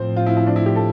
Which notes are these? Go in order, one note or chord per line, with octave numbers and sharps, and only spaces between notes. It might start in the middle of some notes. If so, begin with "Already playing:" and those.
Already playing: A2 F3 C4 C5
F4
E4
E4
D4
E4
G4
A4